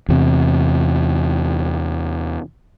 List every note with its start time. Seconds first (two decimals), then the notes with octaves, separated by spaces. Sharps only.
0.09 E2 C3